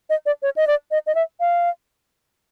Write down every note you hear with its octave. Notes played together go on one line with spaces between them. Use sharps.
D#5
D5
C#5
D#5
D5
D#5
D#5
E5
F5